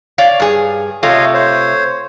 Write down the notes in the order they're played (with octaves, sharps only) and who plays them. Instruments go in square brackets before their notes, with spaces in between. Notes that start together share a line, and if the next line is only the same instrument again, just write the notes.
[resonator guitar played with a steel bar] C#5 D5 F5
G2 G#4
[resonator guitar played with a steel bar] C3 A3 F4 [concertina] C#5 D#5 F5
[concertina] C5 C#5